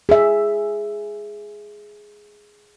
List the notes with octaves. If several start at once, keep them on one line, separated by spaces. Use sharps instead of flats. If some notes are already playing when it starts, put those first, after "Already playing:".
G#4 E5